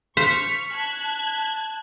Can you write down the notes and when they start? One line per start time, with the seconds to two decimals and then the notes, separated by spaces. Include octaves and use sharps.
0.17 C5 C#6 F6 B6
0.73 A5 F#6 G#6